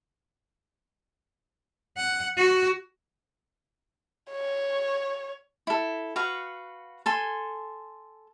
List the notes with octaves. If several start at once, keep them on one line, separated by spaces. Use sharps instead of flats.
F#5
F#4
C#5
E4 A4
F#4 B4 F5 F#5
A4 G#5 C6